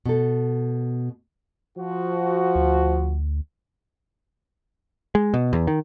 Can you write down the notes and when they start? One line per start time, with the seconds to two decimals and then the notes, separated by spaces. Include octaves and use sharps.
0.06 B2 A4
1.78 F3 F#4
2.55 D2
5.15 G#3
5.34 B2
5.53 E2
5.67 D#3